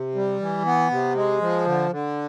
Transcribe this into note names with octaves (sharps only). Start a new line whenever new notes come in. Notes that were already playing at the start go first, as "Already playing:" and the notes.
Already playing: C3
G3
E3
B3
C3
G#3
F3
D3
D3